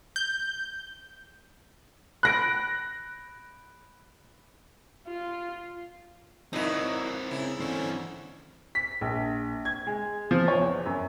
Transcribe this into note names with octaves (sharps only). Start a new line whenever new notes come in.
G6
B5 F#6 A#6 D7
F4
A#2 F#3 C4 D#4 E4 A#4 B4
C#3 E4
D3 E3 C4 C#4
B6
A#1
G#6
G#3
F3
C#5
E2
F#2